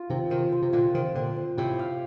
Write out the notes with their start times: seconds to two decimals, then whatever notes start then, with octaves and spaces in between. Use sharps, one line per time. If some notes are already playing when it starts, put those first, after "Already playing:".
Already playing: F4
0.10 C3 D#3 C4
0.30 C3 D#3 C4
0.52 C5
0.62 C3
0.73 A#2 D3 F4
0.94 C3 D#3 C4
1.15 A#2 D3 C4
1.36 C5
1.58 A2 C3 G4
1.79 F5